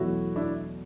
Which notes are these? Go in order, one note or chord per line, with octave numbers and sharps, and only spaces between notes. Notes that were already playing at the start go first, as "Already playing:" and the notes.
Already playing: E2 B2 F#3 A3 E4 F#4
D4 E4